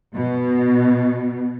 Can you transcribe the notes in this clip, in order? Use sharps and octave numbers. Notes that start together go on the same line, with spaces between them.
B2